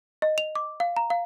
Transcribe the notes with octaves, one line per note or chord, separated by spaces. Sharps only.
D#5
F7
D6
F5
A#5
F5